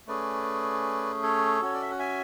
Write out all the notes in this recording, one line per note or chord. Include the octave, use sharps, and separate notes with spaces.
A3 C#4 G#4 B4 D5
A4 C#5
C#4 F#4 C#5
D5
E5
F#5
E5 G#5